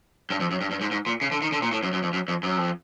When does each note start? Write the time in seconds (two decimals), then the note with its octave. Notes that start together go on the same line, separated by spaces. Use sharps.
0.30 G2
0.40 F2
0.51 F#2
0.61 G2
0.71 G2
0.81 G#2
0.91 G#2
1.07 A#2
1.21 C#3
1.32 D3
1.42 D#3
1.52 D3
1.62 A#2
1.72 A2
1.83 F#2
1.93 F#2
2.03 F2
2.13 F#2
2.28 F2
2.43 F#2
2.57 F2